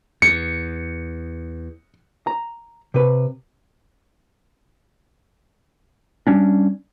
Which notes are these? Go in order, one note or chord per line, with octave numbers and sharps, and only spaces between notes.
E2 C#7
A#5
C3 B4
G3 C#4 D4